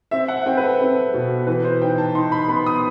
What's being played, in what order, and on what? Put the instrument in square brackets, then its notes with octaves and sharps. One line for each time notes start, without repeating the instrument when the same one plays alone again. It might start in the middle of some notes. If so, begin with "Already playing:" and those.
[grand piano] C4 E5
F#5
F#5
C4 G5
B4
A4
C4
B2
E3 B4
C5
D#4 G5
A5
D#4 C6
B5
B3 B5
D#6